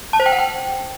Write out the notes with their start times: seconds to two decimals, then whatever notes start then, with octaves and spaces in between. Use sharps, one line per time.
0.13 A5
0.20 C5
0.26 G5
0.32 F#5
0.39 G5